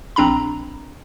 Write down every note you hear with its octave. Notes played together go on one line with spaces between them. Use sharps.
A#1 C4 D4 A#5 B5